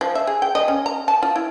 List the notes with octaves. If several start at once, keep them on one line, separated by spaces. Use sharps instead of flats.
F3
E5
G#4
G5
D#5
C#4
A#5
A5
F4
E4